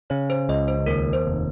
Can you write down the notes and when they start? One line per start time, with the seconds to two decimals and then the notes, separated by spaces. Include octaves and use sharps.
0.10 C#3 C#5
0.30 C5
0.49 C#2 D#5
0.68 C5
0.86 D#2 A#4
1.13 C5
1.25 F1